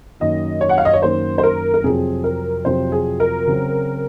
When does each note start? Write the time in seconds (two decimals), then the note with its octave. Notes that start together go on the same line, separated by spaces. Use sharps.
0.20 F#2 D#3 A#3 D#4 D#5
0.61 C#5
0.69 F#5
0.78 F5
0.85 D#5
0.93 C#5
1.02 F#2 D#3 A#3 D#4 C5
1.38 C5
1.43 A#4
1.74 A#4
1.84 F2 C3 F#3 C4 F4 G#4
2.24 A#4
2.65 F2 C3 F#3 C4 F4 C5
2.92 G#4
3.20 A#4
3.47 C#3 F#3 C4 F#4